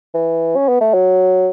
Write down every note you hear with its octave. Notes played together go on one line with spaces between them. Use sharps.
E3
C#4
B3
A3
F#3